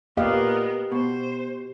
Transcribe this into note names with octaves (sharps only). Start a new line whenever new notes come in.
A#2 B3 G4 A#4 D#5 F5
B2 C5